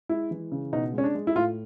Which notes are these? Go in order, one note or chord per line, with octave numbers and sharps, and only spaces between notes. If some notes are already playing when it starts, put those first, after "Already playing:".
G#3 E4
E3
C#3
B2 D#4
G#3 C#4
D4
G#3
E4
A2 F4